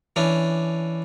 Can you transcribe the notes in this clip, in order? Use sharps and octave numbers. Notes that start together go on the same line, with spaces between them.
E3 C#4 D4